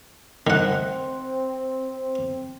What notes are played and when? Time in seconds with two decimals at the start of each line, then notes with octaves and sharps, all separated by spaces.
0.47 D#3 C4 F#5